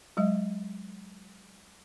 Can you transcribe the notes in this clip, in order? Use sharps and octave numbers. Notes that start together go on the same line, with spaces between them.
F#3 G#3 D#5